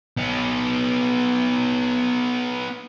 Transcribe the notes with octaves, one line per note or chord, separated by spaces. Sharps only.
B3 D#4